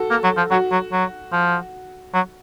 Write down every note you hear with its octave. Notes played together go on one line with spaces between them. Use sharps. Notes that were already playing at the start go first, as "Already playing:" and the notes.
Already playing: F#4 A4
A#3
F#3
F3
F#3 F#4
F#3
F#3
F3
F#3